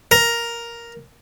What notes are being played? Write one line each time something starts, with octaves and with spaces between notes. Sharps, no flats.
A#4